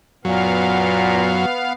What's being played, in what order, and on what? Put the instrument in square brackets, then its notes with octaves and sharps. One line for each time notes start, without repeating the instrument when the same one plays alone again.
[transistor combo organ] F#2 F#3 [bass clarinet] A#2 [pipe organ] B3 F5